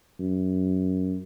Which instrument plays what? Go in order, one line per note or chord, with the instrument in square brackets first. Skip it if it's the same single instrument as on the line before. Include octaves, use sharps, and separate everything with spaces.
[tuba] F#2